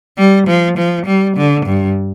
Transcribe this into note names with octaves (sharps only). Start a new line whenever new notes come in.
G3
F3
F3
G3
D3
G2